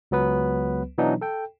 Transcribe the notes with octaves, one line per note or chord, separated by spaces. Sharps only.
C#2 F#3 B3 B4
B2 E3 F#3 B3 D4 D#4
A4 G5